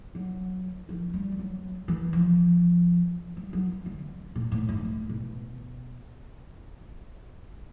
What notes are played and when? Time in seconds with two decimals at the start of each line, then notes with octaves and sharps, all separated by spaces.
0.15 F#3
0.89 F3
1.14 G3
1.39 F#3
1.88 E3
2.13 F3
3.37 G3
3.53 F#3
3.86 D3
4.36 A#2
4.52 A2
4.69 G#2
4.85 A2
5.09 B2